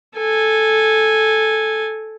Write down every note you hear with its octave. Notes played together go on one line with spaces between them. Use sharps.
A4 G#5